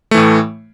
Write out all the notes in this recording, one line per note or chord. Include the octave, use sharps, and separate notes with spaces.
A2 E3 A3